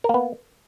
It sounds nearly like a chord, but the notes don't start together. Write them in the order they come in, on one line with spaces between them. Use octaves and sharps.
A#4 A#3 B3